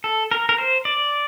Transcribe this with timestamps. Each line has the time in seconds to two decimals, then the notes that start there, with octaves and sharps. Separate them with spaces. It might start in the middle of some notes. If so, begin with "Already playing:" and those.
0.04 A4
0.31 A#4
0.49 A#4
0.58 C5
0.85 D5